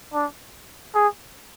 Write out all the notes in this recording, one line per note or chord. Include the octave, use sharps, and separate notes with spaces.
D4
G#4